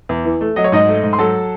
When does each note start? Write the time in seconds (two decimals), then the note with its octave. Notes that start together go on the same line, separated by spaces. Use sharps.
0.09 E2
0.25 E3
0.41 A3
0.56 F#3 D#5
0.64 C#5
0.72 G#2 D#4 D#5
0.88 A3
1.03 G#2
1.13 C6
1.18 F#3 A4 A5